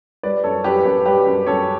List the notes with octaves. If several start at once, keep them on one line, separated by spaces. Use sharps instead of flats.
G3 B4 D5
F#2 A4 C#5
F#2 G4 B4
F#2 G4 B4
G3 G4 B4
F#2
F#2 A4 C#5